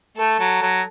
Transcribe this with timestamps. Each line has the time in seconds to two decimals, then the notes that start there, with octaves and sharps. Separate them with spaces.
0.16 A3 A4
0.40 F#3
0.62 F#3